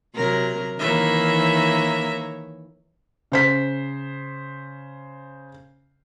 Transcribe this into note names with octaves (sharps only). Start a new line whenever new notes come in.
C3 F#3 A#4
D#3 E3 A#3 C#5 E5
C#3 C5 B6